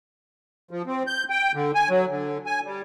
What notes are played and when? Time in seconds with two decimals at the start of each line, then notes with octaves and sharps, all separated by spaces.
0.71 F3
0.86 C4
1.07 G6
1.30 G5
1.54 D3
1.75 G#5
1.89 F#3
2.09 D3
2.46 G#5
2.65 G3